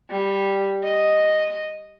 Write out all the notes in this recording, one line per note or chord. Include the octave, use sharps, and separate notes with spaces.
G3
D#5